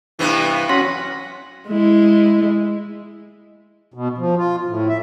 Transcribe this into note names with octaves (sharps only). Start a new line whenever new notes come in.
G2 C3 E3 B3
F#3 C#4 F#5 B5 C6 A#6
G#3 E4
B2
F3
F4
A2
E5